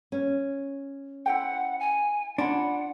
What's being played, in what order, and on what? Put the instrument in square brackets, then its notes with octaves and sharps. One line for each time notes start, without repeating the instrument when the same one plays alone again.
[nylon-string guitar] C#4
[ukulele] E4 C5 G5 [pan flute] F#5
[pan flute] G#5
[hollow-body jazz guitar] D4 [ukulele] F4 C#5 B5 [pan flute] F#5